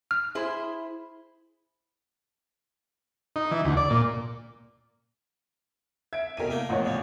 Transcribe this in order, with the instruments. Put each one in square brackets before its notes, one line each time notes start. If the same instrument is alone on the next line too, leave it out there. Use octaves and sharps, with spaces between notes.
[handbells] F6
[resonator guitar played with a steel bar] E4 G#4 C5
[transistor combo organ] D#4
E3
D2
D5
A#2
[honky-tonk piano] E5 [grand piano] G#6 D7
[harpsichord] C2 G2 B2 [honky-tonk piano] A#4 D#7
[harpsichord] A3 A#3 G5
[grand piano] A#1 E2 A2 [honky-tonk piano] C#5 D#5 F#5
[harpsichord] C#3 G3 [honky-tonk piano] D5